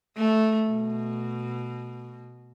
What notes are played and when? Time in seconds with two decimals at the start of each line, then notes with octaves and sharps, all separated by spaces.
0.17 A3
0.68 B2